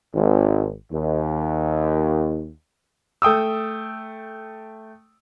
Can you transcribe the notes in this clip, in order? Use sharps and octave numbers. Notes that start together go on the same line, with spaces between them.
G#1
D#2
A3 G5 D#6 E6